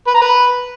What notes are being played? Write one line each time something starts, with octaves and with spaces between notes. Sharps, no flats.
B4
A#5
B4